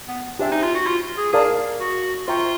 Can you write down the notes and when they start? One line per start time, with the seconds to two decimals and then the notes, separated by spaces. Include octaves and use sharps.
0.08 B3
0.39 D4 G4 C5 E5 G#5
0.51 D#4
0.62 F4
0.75 F#4
0.86 F4
1.17 G#4
1.33 G#4 A#4 D5 F5 A5
1.80 F#4
2.27 F4 C5 E5 G5 A#5 C#6